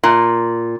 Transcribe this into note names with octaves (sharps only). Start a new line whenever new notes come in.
A#2